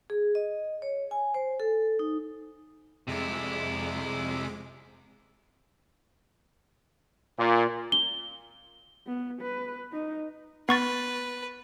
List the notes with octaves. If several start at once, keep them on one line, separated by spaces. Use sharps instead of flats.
G#4
D#5
C#5
G#5
C5
A4
D#4
F2 C3 G#3 E4 D6
A#2
G7
B3
B4
D#4
B3 B4 C#6 A6